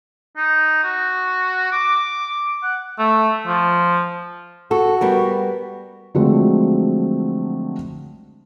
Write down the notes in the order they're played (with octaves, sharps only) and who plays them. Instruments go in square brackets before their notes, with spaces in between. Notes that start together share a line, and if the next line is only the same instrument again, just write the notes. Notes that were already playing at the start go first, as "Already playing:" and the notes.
[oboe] D#4
F#4
D6
F#5
[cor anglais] A3
F3
[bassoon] F#4 [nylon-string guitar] A4
[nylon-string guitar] G3 B3 A#4
[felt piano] D3 F3 F#3 G#3 A3 C4